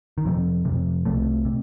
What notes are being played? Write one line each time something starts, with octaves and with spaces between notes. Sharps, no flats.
D#3
F2 C3 F3
F2 C3
C2 C3 A3
C3